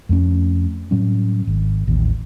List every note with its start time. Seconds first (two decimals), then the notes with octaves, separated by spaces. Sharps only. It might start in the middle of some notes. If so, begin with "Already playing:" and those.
0.09 F2 A3 C#4
0.91 A2 F#3 G3 C#4
1.47 G#1
1.87 A1 D#2